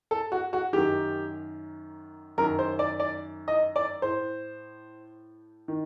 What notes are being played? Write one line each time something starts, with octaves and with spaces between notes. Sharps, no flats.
A4
F#4
F#4
F#2 D#3 G4
F#2 D#3 A#4
C5
D5
D5
D#5
D5
A2 C5
D#3